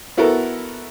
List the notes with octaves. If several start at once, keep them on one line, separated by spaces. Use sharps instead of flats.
B3 E4 F#4 A4 A#4